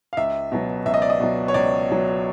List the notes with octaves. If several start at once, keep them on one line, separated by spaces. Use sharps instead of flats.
F5
C#2 E5
B2 F#3
C#2 E5
D#5
D5
D#5
B2 F#3
C#5
C#2 D5
B2 F#3